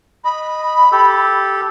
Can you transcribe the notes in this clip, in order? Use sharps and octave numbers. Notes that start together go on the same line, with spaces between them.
D#5 B5
G4 A4